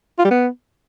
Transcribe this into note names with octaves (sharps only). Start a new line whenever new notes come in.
F4
G3
B3